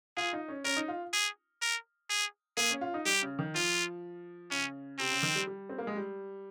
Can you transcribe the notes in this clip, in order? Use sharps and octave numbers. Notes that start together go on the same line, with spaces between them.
F4 G#4
D#4
C#4
C#4 A#4
D#4
F4
G#4
A#4
G#4
A#3 G#4
C#4
F4
D#4
G3 G4
C#3
D#3
F3 F4
C#3 C#4
C3 C4
C#3
D#3
G3
G3
C4
A#3
G#3
G3